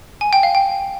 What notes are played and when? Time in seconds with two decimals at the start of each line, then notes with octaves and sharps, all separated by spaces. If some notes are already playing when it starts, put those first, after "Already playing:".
0.21 G#5
0.33 G5
0.43 F5
0.55 G5